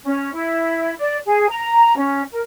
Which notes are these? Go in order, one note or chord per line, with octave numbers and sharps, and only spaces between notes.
C#4
E4
D5
G#4
A#5
C#4
A#4